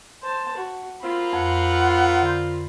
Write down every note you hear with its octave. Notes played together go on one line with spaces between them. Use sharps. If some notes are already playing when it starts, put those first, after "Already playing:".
C5 A5
F#4
A#3 C4 F4 B5
F2 F#5
D3 C6 G6